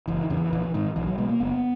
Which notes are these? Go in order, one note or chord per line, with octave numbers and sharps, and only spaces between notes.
F#1 E3
D#3
E2 C#3
E3
A#1 E3
E3
G#2 D#3
B1 E3
F#3
B2 G#3
A#3
F#1 B3